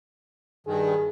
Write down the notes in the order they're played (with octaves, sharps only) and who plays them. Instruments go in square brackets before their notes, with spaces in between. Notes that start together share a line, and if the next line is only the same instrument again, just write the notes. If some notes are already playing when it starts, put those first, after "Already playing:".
[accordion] G2 D#3 [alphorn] G#4